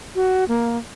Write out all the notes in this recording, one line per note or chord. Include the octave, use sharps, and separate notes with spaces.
F#4
A#3